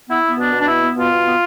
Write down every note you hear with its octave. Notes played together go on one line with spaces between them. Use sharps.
B3 E4
B3
B2 D4
B2
D4
B3 E4
B3
B2 F4
B2
B3